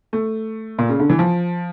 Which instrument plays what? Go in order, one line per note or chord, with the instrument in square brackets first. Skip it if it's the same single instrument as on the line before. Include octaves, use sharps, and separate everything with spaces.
[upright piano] A3
A#2
C#3
D3
E3
F3